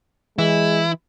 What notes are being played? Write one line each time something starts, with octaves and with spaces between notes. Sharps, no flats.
E3 G#3 E4